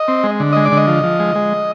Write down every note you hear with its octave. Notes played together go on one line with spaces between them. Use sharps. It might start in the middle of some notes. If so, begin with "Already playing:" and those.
Already playing: D#5
C4
G#3
D3
G#3 D#5
D5
D3
D#5
F3
F3
G#3
G#3